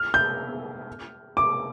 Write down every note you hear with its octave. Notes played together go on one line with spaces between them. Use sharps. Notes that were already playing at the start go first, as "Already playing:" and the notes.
Already playing: F6
G6
D6